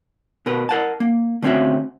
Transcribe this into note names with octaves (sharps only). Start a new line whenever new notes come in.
B2 A#4 B4
A#4 F#5 A5
A#3
D3 A3 C4 C#4 F#4 E5